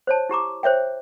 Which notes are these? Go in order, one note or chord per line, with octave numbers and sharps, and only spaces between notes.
C5 C#5 A5
E4 G4 A#5 D6
C5 C#5 E5 G5